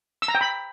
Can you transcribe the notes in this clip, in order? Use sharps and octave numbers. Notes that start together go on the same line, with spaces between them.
E6
A#5
G5
B5